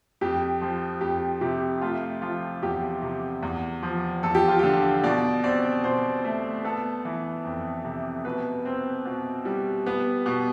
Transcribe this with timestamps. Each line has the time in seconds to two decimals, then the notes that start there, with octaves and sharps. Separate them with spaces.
0.21 F2 G4
0.62 F3
1.01 F2 G4
1.41 C3 G4
1.82 A3 F4
2.22 F3 F4
2.63 E2 G4
3.02 C3
3.42 E2
3.83 F3
4.23 E2 A4
4.35 G4
4.48 F4
4.59 D3 G4
5.04 B2 D5
5.44 C4 D5
5.84 B2 C5
6.24 A3
6.64 B3 A4
7.05 E3
7.44 F2
7.85 C3
8.25 B2 B4
8.65 C4
9.05 B2
9.45 G3
9.86 B3
10.26 B2